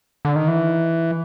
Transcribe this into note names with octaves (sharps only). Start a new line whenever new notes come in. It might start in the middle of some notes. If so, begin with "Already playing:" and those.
D3
D#3
E3